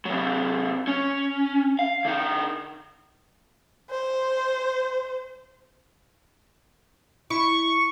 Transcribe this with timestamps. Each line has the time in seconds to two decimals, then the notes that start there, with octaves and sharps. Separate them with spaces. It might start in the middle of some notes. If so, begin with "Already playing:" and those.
0.05 C3 F#3
0.87 C#4
1.79 F5
2.05 D3 D#4
3.90 C5
7.30 E4 C#6